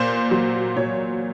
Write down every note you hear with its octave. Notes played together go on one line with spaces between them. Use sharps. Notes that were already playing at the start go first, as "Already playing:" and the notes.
Already playing: A#2 C5
F#3
A#2 C#5